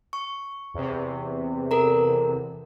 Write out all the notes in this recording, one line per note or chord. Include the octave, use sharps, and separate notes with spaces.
C#6
E2 C3
A4 A#4 A#5